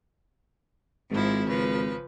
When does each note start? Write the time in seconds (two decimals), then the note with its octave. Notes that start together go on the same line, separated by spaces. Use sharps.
1.11 G#1 G#2 F3 E4
1.47 C#3 F3 B4